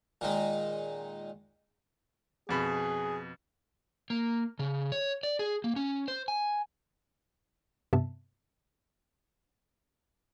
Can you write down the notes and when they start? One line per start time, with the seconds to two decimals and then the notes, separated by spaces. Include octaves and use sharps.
0.21 A#2 D#3 G#3
2.49 F2 B2 G#4 B5
4.10 A#3
4.59 C#3
4.92 C#5
5.23 D5
5.39 G#4
5.64 A#3
5.76 C#4
6.08 C5
6.28 G#5
7.93 G2 C3 B3 E5 A5